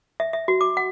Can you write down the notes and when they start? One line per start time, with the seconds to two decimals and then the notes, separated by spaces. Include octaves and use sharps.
0.20 E5
0.33 E5
0.48 F#4
0.61 D6
0.77 F#5